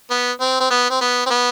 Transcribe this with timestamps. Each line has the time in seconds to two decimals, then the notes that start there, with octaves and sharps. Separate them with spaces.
0.11 B3
0.40 C4
0.60 C4
0.70 B3
0.90 C4
1.01 B3
1.26 C4
1.30 B3